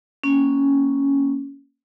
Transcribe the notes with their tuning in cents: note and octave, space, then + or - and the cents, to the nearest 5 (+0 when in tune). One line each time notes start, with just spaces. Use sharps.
A#3 +0 C#4 +0